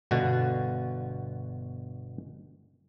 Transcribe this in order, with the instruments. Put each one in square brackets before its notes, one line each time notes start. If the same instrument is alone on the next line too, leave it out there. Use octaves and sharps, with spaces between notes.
[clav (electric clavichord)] G1 B2 D3 F#4